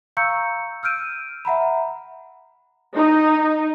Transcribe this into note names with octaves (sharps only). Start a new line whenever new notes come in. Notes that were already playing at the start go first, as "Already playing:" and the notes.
F5 A#5 C#6 E6 G6 C#7
E6 F6 G6 D7 D#7
E5 F#5 A#5 B5
D#4